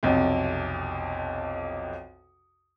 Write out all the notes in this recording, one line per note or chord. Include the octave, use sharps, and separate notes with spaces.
B1 F2 C3